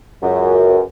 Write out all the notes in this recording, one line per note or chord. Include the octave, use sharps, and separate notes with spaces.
C#2 F#2